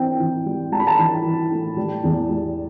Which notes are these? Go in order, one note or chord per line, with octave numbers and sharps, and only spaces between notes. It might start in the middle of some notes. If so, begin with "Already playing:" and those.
Already playing: E3 C4 G5
E3
G3
G3 A5
B5
A5
E3
E3
A2
G3
E2
G3